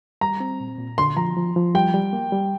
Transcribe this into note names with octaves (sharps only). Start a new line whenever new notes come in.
G3 A#5
C4
A#2
A#2
D3 C6
F3 A#5
F3
F3
G3 G5
G3
A#3
G3